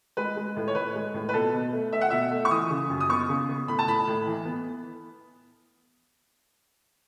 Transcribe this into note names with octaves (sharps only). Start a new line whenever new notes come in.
G#3 B4
G#3
A2
C#5
A2 B4
G#3
A2
B4
B2 A4
B2
A3
A3 E5
F#5
B2 E5
A3
C#6
E3 D#6
C#3
F#2
D#6
B3 C#6
C#3
B3
A2 B5
A5
A2 B5
A2
E3
B3